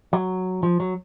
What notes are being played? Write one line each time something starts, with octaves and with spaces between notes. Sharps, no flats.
F#3
F3
F#3